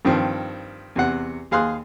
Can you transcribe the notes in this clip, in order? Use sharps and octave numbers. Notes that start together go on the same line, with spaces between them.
G2 D#3 F3 C4
E2 C3 F#5
D#2 G#4 F5 C6 F#6